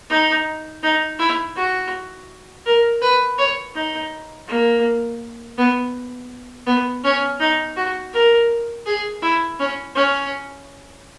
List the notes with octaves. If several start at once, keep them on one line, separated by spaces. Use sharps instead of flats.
D#4
D#4
E4
F#4
A#4
B4
C#5
D#4
A#3
B3
B3
C#4
D#4
F#4
A#4
G#4
E4
C#4
C#4